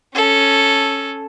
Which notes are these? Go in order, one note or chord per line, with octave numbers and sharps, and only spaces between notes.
C#4 A4